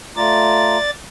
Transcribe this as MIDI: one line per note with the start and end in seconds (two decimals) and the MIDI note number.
0.17 0.78 57
0.17 0.78 65
0.17 0.90 74
0.17 0.78 82
0.17 0.90 93